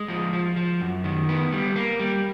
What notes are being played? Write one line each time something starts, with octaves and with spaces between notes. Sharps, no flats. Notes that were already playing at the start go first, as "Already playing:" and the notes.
Already playing: G#3
F3
F3
F3
F#2
D#3
B3
G3
A#3
G3